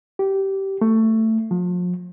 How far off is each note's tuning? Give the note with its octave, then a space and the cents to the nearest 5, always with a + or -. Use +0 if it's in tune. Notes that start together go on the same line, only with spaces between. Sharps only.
G4 -15
A3 +15
F3 +35